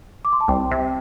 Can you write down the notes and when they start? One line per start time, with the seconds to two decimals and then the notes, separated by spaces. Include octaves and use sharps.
0.25 D6
0.33 C6
0.41 A5
0.48 C2 G5
0.71 C3